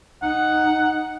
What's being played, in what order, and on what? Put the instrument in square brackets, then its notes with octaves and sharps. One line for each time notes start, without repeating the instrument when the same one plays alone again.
[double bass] D#4 [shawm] F#5